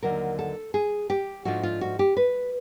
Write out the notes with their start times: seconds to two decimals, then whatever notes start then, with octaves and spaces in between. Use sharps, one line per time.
0.03 D#2 D3 F#3 A#4
0.39 A4
0.74 G#4
1.10 G4
1.45 G#2 F3 A3 D4 F4 F#4
1.63 F4
1.81 F#4
1.99 G4
2.17 B4